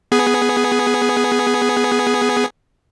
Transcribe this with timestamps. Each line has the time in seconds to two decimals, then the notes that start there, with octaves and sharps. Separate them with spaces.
0.12 B3 G#4